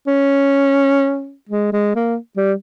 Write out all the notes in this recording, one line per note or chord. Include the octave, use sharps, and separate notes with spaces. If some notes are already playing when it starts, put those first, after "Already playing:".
C#4
G#3
G#3
A#3
G3